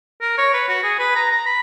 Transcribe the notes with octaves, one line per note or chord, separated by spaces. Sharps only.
A#4
C#5
B4
F#4
G#4
B4
A#5
A#5
B5